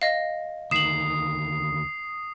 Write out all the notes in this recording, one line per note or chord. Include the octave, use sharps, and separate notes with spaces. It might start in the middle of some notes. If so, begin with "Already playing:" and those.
D#5 F5
D2 D#3 D#6 C7 E7 F#7